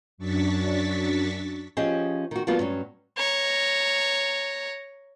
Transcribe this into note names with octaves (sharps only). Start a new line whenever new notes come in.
F#2 F#3 D4 C#6 A6 B6
F3 C#4 G4 G#4 C5 D#5
D#3 F#4
F3 G3 A#3 B3 F4 F#4
G2 F#3 C#4
C#5 A#5